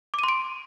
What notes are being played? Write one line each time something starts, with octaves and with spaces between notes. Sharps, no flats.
C6 D6 D7 D#7